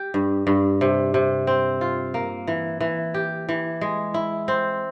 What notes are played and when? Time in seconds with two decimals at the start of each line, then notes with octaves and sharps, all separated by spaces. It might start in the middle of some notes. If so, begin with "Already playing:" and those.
Already playing: G4
0.14 G2
0.47 G2
0.81 C3
1.14 C3
1.47 C4
1.81 F4
2.14 A#3
2.47 E3
2.80 E3
3.14 G4
3.49 E3
3.81 G#3
4.14 E4
4.48 C4